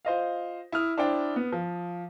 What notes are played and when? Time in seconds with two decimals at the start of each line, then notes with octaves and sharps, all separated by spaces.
0.05 F4 C5 D#5 F5
0.72 E4 D#6 F6
0.98 D4 E4 C5 D5 G5
1.36 B3
1.52 F3